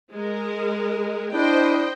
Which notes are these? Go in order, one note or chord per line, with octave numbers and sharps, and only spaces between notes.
G#3 A#4
D4 E4 C5 D#5 G5